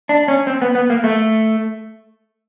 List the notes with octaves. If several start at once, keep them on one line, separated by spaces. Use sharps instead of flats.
D4
C#4
C4
B3
B3
A#3
A3